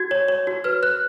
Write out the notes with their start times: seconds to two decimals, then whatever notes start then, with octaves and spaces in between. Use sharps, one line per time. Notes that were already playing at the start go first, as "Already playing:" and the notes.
Already playing: F#4 G#6
0.11 C#5
0.28 C#5
0.47 F#4
0.64 B4 F6
0.83 B4 F#6